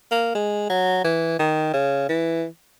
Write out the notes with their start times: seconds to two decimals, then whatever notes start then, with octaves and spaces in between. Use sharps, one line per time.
0.12 A#3
0.35 G#3
0.69 F#3
1.04 E3
1.39 D#3
1.73 C#3
2.09 E3